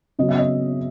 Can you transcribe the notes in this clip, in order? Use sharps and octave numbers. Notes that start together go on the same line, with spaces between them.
C#3 F#3 B3 D#5
E5
D#5